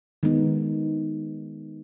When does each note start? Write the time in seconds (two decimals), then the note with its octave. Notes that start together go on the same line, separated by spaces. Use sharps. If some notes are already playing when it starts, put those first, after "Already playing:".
0.23 D#3 G#3 B3 D#4